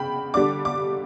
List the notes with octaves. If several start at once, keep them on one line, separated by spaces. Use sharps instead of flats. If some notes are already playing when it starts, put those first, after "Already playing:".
Already playing: C#3 G5 B5
D3 G3 D4 D6
D6